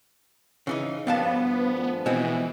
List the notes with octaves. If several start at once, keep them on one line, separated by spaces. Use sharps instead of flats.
C#3 E3 D#4
G2 D#3 F3 B3 D4 F5 A5
A3 D4 F4 G#5
B2 E3 G#3 B3 C4